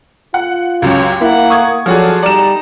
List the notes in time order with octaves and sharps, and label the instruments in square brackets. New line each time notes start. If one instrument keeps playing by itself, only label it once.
[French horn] F4 [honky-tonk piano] F#5
[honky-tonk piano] C#2 F#2 [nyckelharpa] G4 C#5
[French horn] A#3 [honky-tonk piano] E4 [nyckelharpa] F#5
[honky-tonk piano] C#6 D#6 G#6
[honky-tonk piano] F3 F#4 G#4 [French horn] F#3 [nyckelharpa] A4 D5
[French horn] G3 [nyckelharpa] D#4 A#5 [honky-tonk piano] D5 E7